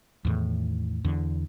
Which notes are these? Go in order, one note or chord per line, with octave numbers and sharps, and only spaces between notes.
E2 A2 D#3
E2 D3